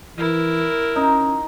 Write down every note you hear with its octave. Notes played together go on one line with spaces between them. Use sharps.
E3 E4 A#4
C#4 D#4